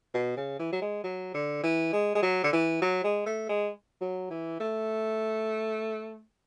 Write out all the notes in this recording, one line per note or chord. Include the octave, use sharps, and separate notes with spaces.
B2
C#3
E3
F#3
G#3
F#3
D3
E3
G#3
G#3
F#3
D3
E3
F#3
G#3
A3
G#3
F#3
E3
A3